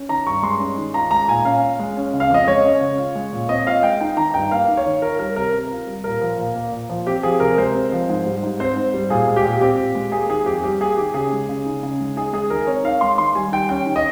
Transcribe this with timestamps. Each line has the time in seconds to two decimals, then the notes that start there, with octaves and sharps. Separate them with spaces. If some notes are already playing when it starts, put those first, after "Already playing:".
Already playing: C#4
0.09 D#3 A#5
0.26 G2 C#6
0.43 G#3 C6
0.60 C#4
0.78 D#3
0.94 F4 A#5
1.11 G#3 A#5
1.28 A#2 G#5
1.45 C#4 F5
1.62 F4
1.79 G#3
1.97 C#4
2.14 C#3
2.20 F5
2.30 F2 D#5
2.47 G#3 C#5
2.65 C#4
2.81 C#3
2.98 F4
3.15 G#3
3.32 A#2
3.49 C4 D#5
3.67 F4 F5
3.83 G#3 G5
4.01 D#4 G5
4.17 D#3 A#5
4.34 G2 G5
4.51 A#3 F5
4.68 D#4
4.77 C#5
4.86 D#3
5.02 F4 A#4
5.19 G3 A#4
5.36 C3 A#4
5.53 C4
5.71 F4
5.87 G3
6.04 A#2 A#4
6.21 F3
6.38 A#2
6.55 A#3
6.72 A#2
6.89 F3
7.07 C4 G4
7.23 F3 G#4
7.40 C3 A#4
7.58 G#3 C5
7.75 C4
7.92 F3
8.09 G#2
8.26 G3
8.42 G#2
8.60 C4 C5
8.76 G#2
8.94 G3
9.10 A#2 G#4
9.28 G#3
9.36 G4
9.45 A#2
9.61 C4 G4
9.79 A#2
9.95 G#3
10.12 A#3 G#4
10.30 D#3 G#4
10.46 F2 G4
10.64 G3 G4
10.81 A#3 G#4
10.97 D#3 G4
11.14 C#3 G#4
11.32 G#3
11.49 C#3
11.66 D#4
11.83 C#3
12.00 G#3
12.16 D#4 G#4
12.33 G#3 G#4
12.50 D#3 A#4
12.67 C4 C#5
12.84 D#4 F5
13.01 G#3 C6
13.18 D#3 C6
13.35 G3 G#5
13.52 D#3 G5
13.69 C#4 G5
13.86 D#3
13.96 D#5